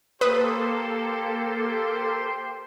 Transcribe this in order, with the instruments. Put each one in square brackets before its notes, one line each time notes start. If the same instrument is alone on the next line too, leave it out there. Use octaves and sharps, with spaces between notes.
[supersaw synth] A#3 A4 [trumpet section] G4 C5 [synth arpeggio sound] B4 D#6